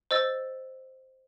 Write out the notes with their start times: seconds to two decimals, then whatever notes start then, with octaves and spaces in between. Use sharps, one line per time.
0.11 C5 D#5 E6 A6